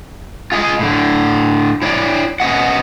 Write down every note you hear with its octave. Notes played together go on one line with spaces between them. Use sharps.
F4 G#4 D#5
A2 D3
E4 C#5 D5
B3 C#4 F#4 D#5 F#5